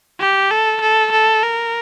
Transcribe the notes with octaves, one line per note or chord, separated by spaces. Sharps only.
G4
A4
A4
A4
A#4